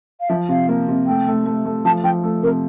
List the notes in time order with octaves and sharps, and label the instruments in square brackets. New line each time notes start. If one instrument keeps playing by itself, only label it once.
[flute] F5
[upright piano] F3 [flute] E5
[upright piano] C3 [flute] F5
[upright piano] A#3
C3
[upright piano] A3 [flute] G5
[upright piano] A3
A3
A3
[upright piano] F3 [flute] A5
[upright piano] F3 [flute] G5
[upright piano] A3
[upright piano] C3 [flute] A#4